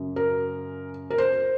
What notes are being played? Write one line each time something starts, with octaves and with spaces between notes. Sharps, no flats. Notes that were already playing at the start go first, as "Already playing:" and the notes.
Already playing: F#2 C#3
A#4
A#4
C5